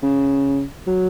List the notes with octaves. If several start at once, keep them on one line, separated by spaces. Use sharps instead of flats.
C#3
F#3